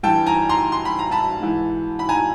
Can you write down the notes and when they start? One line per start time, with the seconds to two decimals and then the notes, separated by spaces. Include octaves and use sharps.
0.03 G2 E3 G5 A5
0.26 G#5 A#5
0.49 A#5 C6
0.72 C6
0.85 B5
0.99 A#5
1.11 A5 B5
1.40 G#2 E3
1.99 B5
2.09 G#5 A#5